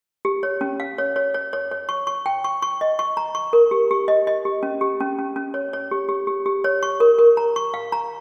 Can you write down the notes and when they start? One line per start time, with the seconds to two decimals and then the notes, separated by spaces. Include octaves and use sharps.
0.25 G4
0.43 C#5
0.61 C#4
0.80 F5
0.98 C#5
1.16 C#5
1.34 C#5
1.53 C#5
1.71 C#5
1.89 C#6
2.07 C#6
2.26 G5
2.44 C#6
2.62 C#6
2.81 D#5
2.99 C#6
3.17 A#5
3.35 C#6
3.53 A#4
3.71 G4
3.91 G4
4.08 D#5
4.27 D#5
4.45 G4
4.63 C#4
4.81 G4
5.00 C#4
5.19 C#4
5.36 C#4
5.54 C#5
5.73 C#5
5.91 G4
6.09 G4
6.27 G4
6.46 G4
6.64 C#5
6.83 C#6
7.00 A#4
7.19 A#4
7.37 A#5
7.56 C#6
7.74 F5
7.92 A#5